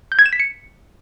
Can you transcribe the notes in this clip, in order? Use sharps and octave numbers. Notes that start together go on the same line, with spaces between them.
G6
G#6
E7
B6
C#7